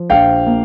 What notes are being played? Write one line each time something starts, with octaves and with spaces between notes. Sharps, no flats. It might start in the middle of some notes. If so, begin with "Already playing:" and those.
Already playing: F3
A#1 F5 G5
A#3